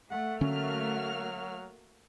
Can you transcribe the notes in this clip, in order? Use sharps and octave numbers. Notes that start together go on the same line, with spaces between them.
A3 F#5
D3 F#3 A#3 C#4 F#4 F6